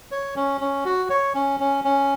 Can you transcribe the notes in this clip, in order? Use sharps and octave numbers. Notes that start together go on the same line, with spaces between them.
C#5
C#4
C#4
F#4
C#5
C#4
C#4
C#4